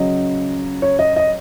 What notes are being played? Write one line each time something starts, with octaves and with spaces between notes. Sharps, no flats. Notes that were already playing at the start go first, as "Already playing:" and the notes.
Already playing: C#3 F#3 C#4 D#5
C#5
D#5
D#5